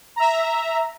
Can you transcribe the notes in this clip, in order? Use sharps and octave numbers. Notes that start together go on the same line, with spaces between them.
E5 A#5